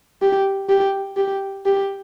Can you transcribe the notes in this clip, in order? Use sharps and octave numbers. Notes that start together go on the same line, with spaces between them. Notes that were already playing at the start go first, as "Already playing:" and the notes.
G4
G4
G4
G4